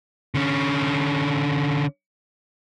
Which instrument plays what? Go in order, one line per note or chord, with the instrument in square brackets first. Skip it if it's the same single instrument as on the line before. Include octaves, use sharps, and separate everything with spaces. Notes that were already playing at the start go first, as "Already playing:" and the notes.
[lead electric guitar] D3 C#4